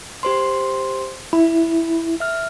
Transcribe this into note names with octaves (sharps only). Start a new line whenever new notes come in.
G4 C5 C6
E4 B5
E5 F6